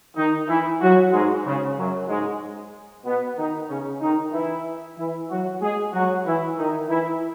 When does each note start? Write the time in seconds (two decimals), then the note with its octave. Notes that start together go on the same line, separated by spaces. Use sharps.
0.16 D#3 D#4
0.48 E3 E4
0.81 F#3 F#4
1.12 G#2 G#3
1.44 C#3
1.76 F#2 F#3
2.08 G#2 G#3
3.04 B2 B3
3.36 D#3 D#4
3.69 C#3 C#4
4.00 D#3 D#4
4.32 E3 E4
4.97 E3 E4
5.29 F#3 F#4
5.61 G#3 G#4
5.93 F#3 F#4
6.26 E3 E4
6.57 D#3 D#4
6.89 E3 E4